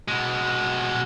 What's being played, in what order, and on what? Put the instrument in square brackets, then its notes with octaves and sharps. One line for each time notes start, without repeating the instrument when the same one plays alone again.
[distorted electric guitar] B2 G#3